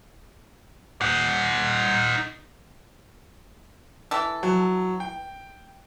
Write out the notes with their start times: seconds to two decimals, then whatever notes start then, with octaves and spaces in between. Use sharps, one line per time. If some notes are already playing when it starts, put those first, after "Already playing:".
1.01 D#4 F#5
4.11 E3 A4
4.43 F#3
5.00 G5